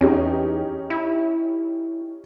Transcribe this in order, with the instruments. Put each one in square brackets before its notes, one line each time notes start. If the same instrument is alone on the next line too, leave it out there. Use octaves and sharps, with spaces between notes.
[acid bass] E2 [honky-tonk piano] C#4 D#4 G4
[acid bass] E4